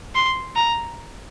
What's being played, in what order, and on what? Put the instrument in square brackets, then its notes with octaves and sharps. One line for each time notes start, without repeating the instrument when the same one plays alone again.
[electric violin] C6
A#5